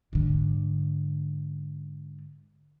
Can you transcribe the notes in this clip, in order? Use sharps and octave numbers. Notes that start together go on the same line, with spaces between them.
G#2 D3